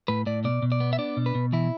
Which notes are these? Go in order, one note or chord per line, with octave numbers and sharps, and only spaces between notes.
A2 B4
A2 D5
B2 D5
B2
D5
B3
E5
D4 D5
B2
B4
B2
E3 E4